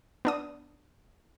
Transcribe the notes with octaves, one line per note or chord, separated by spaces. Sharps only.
B3 D4 D#6